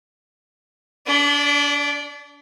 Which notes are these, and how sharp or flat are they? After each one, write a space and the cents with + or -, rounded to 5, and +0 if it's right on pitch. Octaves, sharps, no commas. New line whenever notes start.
D4 -35 D5 +0